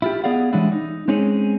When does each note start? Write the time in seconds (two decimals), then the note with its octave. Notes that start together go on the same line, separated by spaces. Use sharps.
0.02 E4 F4 G4
0.24 B3 G#4 D5 F5 F#5
0.53 E3 G3 G#3 C#4 D4 E4
0.72 D#4
1.08 G#3 C4 C#4 D#4 G#4